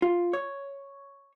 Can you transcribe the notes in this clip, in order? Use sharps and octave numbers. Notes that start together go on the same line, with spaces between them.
F4
C#5